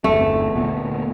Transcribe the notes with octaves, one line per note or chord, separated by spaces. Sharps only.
G1 E2 A3 C4
D2 A#2 B3